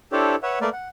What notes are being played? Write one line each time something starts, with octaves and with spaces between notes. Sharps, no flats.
D4 E4 G4 A4 C5 C#5
B4 C#5 E5 F#5
A3 A#3 A#4 B4 D5
F#5